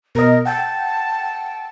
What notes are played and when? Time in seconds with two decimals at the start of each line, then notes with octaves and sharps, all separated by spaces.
0.15 B2 A#4 D#5
0.46 F#5 G5 A5